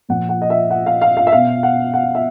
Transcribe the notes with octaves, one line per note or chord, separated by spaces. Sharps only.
A#2 F3 F#5
F#5
D#5
E5
F#5
F5
F5
F5
E5
B2 F5
F#5
F#5
E5